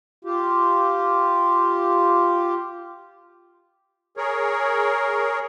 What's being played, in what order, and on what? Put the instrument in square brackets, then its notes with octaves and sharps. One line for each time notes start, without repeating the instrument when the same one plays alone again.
[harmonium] F4 G4
[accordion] G#4 A#4 C#5